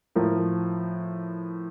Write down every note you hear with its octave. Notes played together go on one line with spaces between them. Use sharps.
A2 F3 A#4